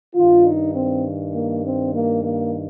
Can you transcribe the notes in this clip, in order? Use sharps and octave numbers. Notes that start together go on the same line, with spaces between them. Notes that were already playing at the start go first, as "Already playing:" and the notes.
G2 D#3 F4
D#4
C4
A#3
C4
A#3
A#3